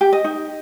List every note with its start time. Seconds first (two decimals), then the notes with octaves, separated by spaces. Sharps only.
0.01 G4
0.13 D#5
0.24 D#4